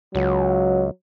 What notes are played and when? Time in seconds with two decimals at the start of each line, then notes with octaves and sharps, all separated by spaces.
0.15 C#2 F#3